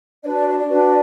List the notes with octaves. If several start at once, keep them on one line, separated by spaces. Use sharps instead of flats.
D4 F#4 B4 D5
D5
D5
D5
D4 F#4 B4